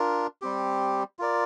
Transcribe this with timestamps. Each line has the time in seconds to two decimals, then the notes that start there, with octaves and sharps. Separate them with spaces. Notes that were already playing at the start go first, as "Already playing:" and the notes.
Already playing: D4 F4 A#4
0.42 G3 C4 G4
1.19 F4 A#4 D5